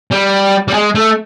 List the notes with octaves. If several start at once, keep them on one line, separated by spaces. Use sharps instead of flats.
G3
G3
G#3
A3